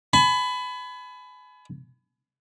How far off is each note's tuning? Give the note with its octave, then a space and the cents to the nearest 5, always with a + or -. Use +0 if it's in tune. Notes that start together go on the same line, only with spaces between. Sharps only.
G#5 +40 B5 +20